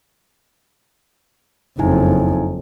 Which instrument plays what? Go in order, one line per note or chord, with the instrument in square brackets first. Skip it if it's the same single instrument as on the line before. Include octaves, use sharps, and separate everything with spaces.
[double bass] F#1 F2 [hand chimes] D#4 E4 G#5